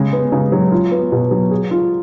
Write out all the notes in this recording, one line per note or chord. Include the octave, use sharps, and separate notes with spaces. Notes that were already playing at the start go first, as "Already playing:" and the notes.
Already playing: C#3 G#3
B3
C#3
F#3
F4
B3
B2
F#3
G#4
F4